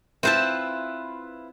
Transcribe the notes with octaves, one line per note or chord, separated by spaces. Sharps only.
C4 E4 F4 B4 C5 A5